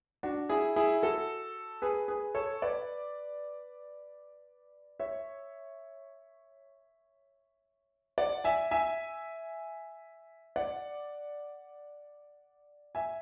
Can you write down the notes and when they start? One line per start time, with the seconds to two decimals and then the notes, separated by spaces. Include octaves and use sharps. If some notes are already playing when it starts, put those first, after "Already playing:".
0.23 D4 F#4
0.49 E4 G#4
0.76 E4 G#4
1.02 F#4 A4
1.82 G#4 B4
2.08 G#4 B4
2.35 A4 C#5
2.62 B4 D5
5.00 C#5 E5
8.18 D5 F#5
8.44 E5 G#5
8.71 E5 G#5
10.56 D5 F#5
12.95 E5 G#5